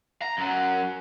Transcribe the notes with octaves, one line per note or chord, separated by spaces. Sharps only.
A#5
F#2 F#3